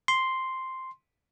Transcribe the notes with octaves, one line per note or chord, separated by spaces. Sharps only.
C6